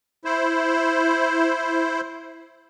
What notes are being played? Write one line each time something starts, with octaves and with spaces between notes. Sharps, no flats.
E4 C5